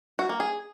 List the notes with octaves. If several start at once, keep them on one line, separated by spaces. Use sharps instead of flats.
F#4
A#3
G#4